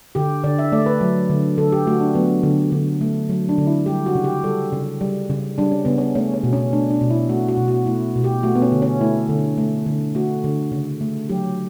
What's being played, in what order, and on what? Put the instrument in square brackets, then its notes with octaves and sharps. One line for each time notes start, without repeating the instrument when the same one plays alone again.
[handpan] D3 G4
D3 D5
E5
A3 D5
B4
F#3
D3
D3 A4
G4
A3 F#4
D4
F#3 B3
D3
D3
A3
F#3
D4
D3
E4
G3 G4
F#4
C#3
G4
G3 A4
C#3
G3
C#3
G3 D4
C#4
C#3 B3
C#4
A3 C#4
C#4
B2
C#4
A3 D4
D4
B2
E4
A3 F#4
F#4
B2
F#4
A3 E4
B2
G4
A3 F#4
B3
C#4
D3
C#4
A3 E4
D3
A3
D3
A3 F#4
D3
C#3
A3
F#3 G4